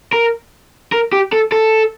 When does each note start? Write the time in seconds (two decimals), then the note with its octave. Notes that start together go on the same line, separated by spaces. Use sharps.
0.13 A#4
0.92 A#4
1.12 G4
1.32 A4
1.52 A4